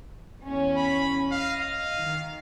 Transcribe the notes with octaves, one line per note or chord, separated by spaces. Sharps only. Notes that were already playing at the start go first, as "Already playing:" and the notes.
E2 C#4
B5
D#5 F5
F5
D#3